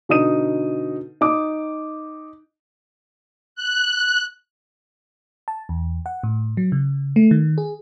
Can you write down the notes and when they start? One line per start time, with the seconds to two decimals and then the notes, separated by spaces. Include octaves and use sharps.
0.09 B2 D3 D#4 D#6 D#7
1.21 D#4 D6 D#6
3.55 F#6
5.48 A5
5.69 E2
6.06 F#5
6.23 A2
6.57 F#3
6.72 C#3
7.16 A3
7.31 D#3
7.58 G#4